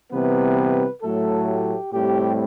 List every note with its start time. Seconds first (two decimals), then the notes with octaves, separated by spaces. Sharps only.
0.13 C3 E3 G3 B3 B4
1.03 A2 F#3 A3 A4
1.48 G4
1.93 A2 G3 C4 G4